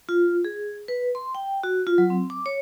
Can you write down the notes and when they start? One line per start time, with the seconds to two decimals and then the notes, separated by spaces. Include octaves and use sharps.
0.09 F4
0.45 G#4
0.88 B4
1.15 C6
1.35 G5
1.64 F#4
1.87 F4
1.98 F#3
2.10 C4
2.30 D6
2.46 C#5